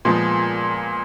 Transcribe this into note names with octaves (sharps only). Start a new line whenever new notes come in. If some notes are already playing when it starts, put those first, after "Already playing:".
A#2 F3 G#3 B3